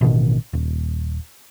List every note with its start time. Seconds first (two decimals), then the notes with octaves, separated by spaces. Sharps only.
0.01 A1 B2 D#3
0.53 D#1